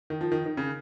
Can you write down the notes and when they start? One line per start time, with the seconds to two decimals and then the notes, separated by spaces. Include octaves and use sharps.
0.10 D#3
0.21 F3
0.32 D#3
0.46 D#3
0.57 C#3